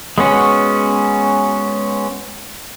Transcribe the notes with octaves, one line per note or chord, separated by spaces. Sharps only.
G#3 B3 C#4 F#4